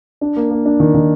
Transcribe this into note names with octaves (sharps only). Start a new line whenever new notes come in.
D4
A#3
A#3
D4
D#3
D#3